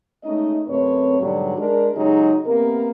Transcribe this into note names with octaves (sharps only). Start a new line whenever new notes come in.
G#3 A3 C#4 D#4 D#5
F#2 C3 A3 C4 B4 C#5
G#2 B2 D3 F#3 G3
G#3 D4 A#4
C#3 F#3 G#3 D#4 G4 G#4
C3 A#3 B3 A#4